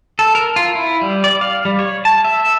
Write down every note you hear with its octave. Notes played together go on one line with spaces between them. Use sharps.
A4
A#4
F4
E4
G3
D5
F5
G3
C#5
A5
E5